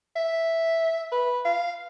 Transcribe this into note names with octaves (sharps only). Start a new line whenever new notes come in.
E5
B4
F5